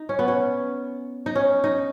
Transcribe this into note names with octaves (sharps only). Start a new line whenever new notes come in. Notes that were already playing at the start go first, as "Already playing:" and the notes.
Already playing: D#4
C#4
B3
C#4
D#4
C#4
D#4